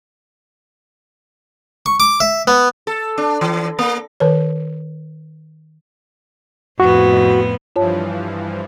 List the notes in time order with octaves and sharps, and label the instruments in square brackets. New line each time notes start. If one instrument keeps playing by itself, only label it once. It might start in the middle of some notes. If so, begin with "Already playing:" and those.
[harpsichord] C#6
D6
E5
B3
[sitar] A4
D4
E3
A#3
[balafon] D#3 B4 C#5
[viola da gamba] F2 A2 B3 [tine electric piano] F#4
[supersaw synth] G2 E3 F3 [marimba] F4 C#5 A5